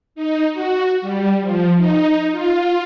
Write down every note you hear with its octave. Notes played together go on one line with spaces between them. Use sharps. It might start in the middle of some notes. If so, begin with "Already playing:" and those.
D#4
F#4
G3
F3
D#4
F4